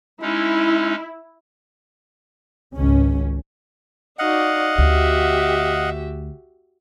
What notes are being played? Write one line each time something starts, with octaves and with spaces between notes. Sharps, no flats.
G#3 C#4 D#4 E4
G#1 C#2 C#4
D#4 F#4 D5 D#5 F5 F#5
D2 F#4 G4 E5